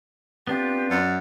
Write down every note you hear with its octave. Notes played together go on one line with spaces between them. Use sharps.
B3 C4 D4 F4 G4
F#2 D5